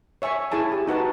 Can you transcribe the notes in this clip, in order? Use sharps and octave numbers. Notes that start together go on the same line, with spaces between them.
C#5 E5 G#5 C#6
E4 G#4 G#5 A5
G4
D#4 F#4 B4 A5